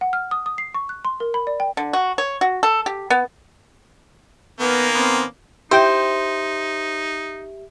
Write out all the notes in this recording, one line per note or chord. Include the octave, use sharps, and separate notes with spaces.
F#5
F6
D#6
D#6
C7
C#6
F#6
C6
A#4
B5
D5
G5
D3
F#4
C#5
F#4
A4
G4
B3
D#3 A#3 B3 C#4
B3 C4 C6
D#4 E4 G4 C5 E5 G5